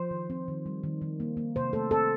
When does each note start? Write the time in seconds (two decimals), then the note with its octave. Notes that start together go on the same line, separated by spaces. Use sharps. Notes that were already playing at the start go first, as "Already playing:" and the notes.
Already playing: F3 C5
0.11 D#3
0.30 C4
0.48 D#3
0.66 G3
0.83 D#3
1.01 D#3
1.20 A#3
1.37 A#3
1.56 C3 C5
1.73 A3 A4
1.91 C4 A4